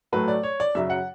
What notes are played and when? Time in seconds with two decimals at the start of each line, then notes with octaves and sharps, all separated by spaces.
0.12 A2 F#3 A3 B4
0.28 D5
0.43 C#5
0.60 D5
0.75 F#2 C#3 F#3 E5
0.90 F#5